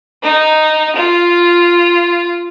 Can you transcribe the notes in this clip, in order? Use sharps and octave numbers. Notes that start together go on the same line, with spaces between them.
D#4
F4